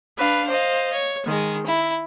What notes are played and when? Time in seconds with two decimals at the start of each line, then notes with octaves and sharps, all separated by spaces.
0.18 D4 B4 F5
0.48 C5 D#5 F5
0.92 C#5
1.25 D#3 G#3
1.65 E4